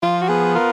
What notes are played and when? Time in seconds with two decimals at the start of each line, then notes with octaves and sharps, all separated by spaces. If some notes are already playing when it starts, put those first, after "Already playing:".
0.02 F3 F4
0.22 F#4
0.29 B3 G#4
0.55 F4 A#4